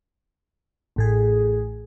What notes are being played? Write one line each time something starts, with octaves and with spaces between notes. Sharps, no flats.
A1 A2 G#4